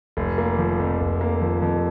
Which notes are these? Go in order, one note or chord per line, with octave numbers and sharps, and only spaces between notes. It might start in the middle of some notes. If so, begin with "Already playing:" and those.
F1
A#3
F3
F2
F1
A#3
F3
F2